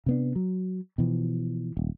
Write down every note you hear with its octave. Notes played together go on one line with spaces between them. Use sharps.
C3 B3 D4
F#3
B2 E3 F3
D#1